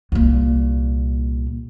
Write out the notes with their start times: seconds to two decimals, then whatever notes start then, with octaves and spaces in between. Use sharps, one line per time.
0.12 C2 A#2